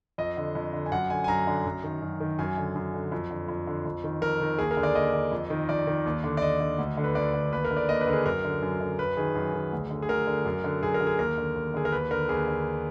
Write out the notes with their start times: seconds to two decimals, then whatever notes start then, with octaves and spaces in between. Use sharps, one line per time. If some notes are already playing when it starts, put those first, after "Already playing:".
0.18 F2 D#5
0.37 D3
0.55 F2
0.73 D3
0.86 G#5
0.92 F#2 F#5
1.10 D3 G#5
1.24 G#5
1.28 F#2 A#5
1.47 D3
1.66 F#2
1.84 D#3
2.02 F#2
2.20 D#3
2.39 F#2 G#5
2.57 D3
2.76 F#2
2.94 D3
3.12 F2
3.31 D3
3.48 F2
3.67 D3
3.85 F2
4.04 D#3
4.22 F2 A#4
4.41 D#3
4.58 D#2 G#4
4.71 A#4
4.77 D3
4.83 D5
4.95 D#2 D#5
5.13 D3
5.32 F2
5.50 D#3
5.69 F2 D5
5.87 D#3
6.06 D#2
6.24 D3
6.37 D5
6.42 D#2 D#5
6.61 D3
6.79 D2
6.97 D3
7.04 B4
7.15 D2 D5
7.34 D3
7.52 D#2 B4
7.65 A#4
7.71 D3
7.77 D5
7.89 D#2 D#5
8.01 B4
8.07 D3 A#4
8.13 G#4
8.26 F#2 A#4
8.44 D3
8.62 F#2
8.81 D3
8.99 F#2 B4
9.17 D#3 G#4
9.35 F#2
9.54 D#3
9.73 D2
9.90 D3
10.02 G#4
10.09 D2 A#4
10.27 D3
10.45 F#2
10.64 D3
10.83 F#2 G#4
10.94 A#4
11.01 D3
11.07 G#4
11.19 D#2 A#4
11.38 D3
11.56 D#2
11.74 D3 G#4
11.85 A#4
11.92 D#2 B4
12.11 D3 A#4
12.29 D#2 G#4
12.48 D3